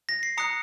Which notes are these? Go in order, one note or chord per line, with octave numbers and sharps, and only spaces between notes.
A#6
C7
A#5 D#6 F#6 C#7